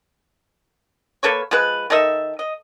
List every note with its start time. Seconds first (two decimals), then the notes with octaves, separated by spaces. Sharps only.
1.23 A#3 A4 B4 C#5
1.51 F3 G#3 B4
1.90 D#3 A4 D#5 E5
2.39 D#5